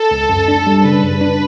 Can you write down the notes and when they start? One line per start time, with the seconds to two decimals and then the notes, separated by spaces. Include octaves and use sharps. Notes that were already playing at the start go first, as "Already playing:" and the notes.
Already playing: A4
0.11 C#2
0.29 F#2
0.48 D4
0.66 G3
0.85 C#3 B4
1.03 F#2
1.21 D4